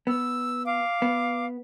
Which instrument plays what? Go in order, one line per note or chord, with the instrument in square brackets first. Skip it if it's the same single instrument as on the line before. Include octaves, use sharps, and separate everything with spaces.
[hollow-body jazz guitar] B3 [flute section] E6
[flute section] F5 D6
[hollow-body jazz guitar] B3